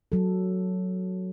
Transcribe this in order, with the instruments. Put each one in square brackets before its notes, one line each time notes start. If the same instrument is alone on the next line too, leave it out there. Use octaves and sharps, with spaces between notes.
[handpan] F#3 A4